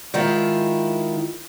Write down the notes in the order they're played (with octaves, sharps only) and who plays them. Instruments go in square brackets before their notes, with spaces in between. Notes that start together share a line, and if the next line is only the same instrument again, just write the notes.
[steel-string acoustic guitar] D#3 G#3 E4 F4